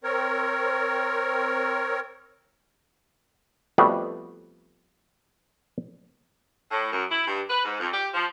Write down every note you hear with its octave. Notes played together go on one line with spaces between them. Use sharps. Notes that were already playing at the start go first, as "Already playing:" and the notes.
C4 A#4 C#5
F2 G3 A3 B3 F#4 F#5
A2
F#2
E4
G2
B4
G#2
F2
G4
F3